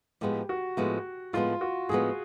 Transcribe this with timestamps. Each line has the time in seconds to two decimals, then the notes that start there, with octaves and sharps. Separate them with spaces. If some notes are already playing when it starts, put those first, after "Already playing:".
0.21 A2 F3 G#3 B3 G4
0.49 F#4
0.77 A2 F3 G#3 B3
1.33 A2 F3 G#3 B3 F4
1.61 F#4
1.89 A2 F3 G#3 B3 G#4